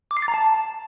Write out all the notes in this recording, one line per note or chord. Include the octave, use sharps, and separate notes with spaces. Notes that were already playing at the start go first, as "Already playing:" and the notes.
D6
C7
A6
A#5
A5